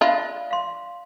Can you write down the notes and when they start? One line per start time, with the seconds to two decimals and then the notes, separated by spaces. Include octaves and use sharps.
0.01 D4 F4 E5 F5 B5
0.51 F5 C6